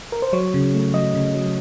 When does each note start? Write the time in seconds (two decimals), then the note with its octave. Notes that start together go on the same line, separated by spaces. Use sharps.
0.12 A#4
0.22 C5
0.33 F#3 C#5
0.54 C#3
0.74 A3
0.94 F#3 D#5
1.14 C#3
1.35 F#3